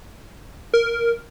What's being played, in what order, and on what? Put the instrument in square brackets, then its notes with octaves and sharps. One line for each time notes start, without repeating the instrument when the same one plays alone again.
[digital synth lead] A#4